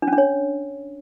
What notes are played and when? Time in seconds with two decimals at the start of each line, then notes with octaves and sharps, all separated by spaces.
0.02 D4
0.08 C#4
0.13 D4
0.18 C#5